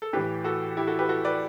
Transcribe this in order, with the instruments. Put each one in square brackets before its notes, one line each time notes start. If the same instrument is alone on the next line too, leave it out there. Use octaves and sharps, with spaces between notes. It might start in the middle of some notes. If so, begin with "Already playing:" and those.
[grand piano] A4
A2 E3 G4 B4
F#4 A4
E4 G4
F#4 A4
G4 B4
F#4 A4
B4 D5